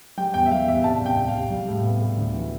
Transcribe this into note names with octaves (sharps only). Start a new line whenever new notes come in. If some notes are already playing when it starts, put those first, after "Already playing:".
G3 G5
E2 G5
E5
G3 F5
E2 E5
C2 A5
C2 G5
C2
F5
C2
G3
A2
B3
A2
D2
E3